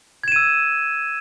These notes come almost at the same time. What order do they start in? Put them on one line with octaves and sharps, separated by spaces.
G#6 E7 D#7 E6